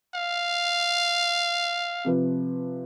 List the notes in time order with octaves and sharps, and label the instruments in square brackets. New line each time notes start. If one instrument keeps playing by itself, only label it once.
[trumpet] F5
[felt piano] C3 F3 B4